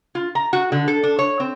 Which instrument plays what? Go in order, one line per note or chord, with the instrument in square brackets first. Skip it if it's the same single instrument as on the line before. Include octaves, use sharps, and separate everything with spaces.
[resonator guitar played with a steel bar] F4
A#5
F#4
D3
A4
D4
C#5
C4